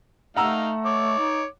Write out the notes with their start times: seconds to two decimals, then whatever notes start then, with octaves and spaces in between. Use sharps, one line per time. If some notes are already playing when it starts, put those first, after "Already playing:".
0.36 A3 D#4 F5 F#5 A#5 E6
0.86 C#5 D6
1.18 D#4